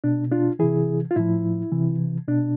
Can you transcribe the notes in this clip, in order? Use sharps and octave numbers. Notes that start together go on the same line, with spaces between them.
B2 D4
D4 F4
C3 E3 E4 G#4
F4
A2 F3 E4
C3 E3
B2 D4